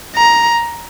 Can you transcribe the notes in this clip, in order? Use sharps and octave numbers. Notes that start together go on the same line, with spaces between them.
A#5